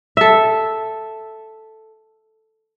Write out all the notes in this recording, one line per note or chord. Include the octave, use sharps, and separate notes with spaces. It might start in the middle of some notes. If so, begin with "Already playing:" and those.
A4 E5